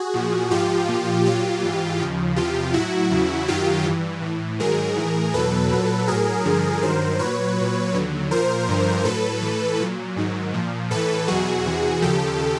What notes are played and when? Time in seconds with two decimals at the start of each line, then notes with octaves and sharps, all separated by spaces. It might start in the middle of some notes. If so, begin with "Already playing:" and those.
Already playing: F#4 G#4
0.14 A#2 F3
0.51 G#2 F3 F4 G4
0.88 A#2 F3
1.25 A#2 F#3 F4 G4
1.63 G#2 E3
1.99 D#2 C#3 F3
2.36 E2 C3 F3 F4 G4
2.73 A2 F#3 E4 F#4
3.11 E2 C#3 F#3
3.48 F#2 D#3 F#3 F4 G4
3.85 G2 E3
4.22 A2 E3
4.60 G#2 D#3 F#3 G#4 A#4
4.96 A2 E3
5.34 E2 B2 F#3 A4 B4
5.71 A#2 F#3
6.08 A2 F#3 G#4 A#4
6.45 G2 D3 F3
6.82 G2 D#3 F#3 A#4 C5
7.19 A#2 F#3 B4 C#5
7.57 A#2 F#3
7.93 D#2 D3 F#3
8.31 A#2 F3 A#4 C5
8.68 G2 D3 F3
9.05 A2 F#3 A4 B4
9.42 A2 E3
9.80 A#2 F#3
10.16 G#2 D#3 F#3
10.54 A#2 F3
10.91 A2 E3 A4 B4
11.28 E2 B2 F#3 F#4 G#4
11.65 E2 C3 E3
12.02 D#2 C#3 F3 G4 A4